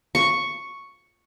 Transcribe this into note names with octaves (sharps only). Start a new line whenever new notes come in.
C#6